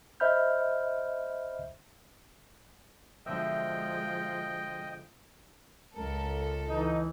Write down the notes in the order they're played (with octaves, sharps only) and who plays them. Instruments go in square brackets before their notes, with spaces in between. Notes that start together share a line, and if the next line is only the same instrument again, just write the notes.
[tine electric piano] C5 D#5 E5 B5 F6 G6
[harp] B2 D3 E5 [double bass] F3 G#3 [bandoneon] D#5 G5
[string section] C#2 A4 [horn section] A#4
[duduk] E3 [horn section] D#4